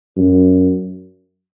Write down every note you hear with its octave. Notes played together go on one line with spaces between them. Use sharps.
F#2